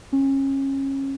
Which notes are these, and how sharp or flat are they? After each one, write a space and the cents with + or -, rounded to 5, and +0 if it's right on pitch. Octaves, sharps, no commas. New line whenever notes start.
C#4 -25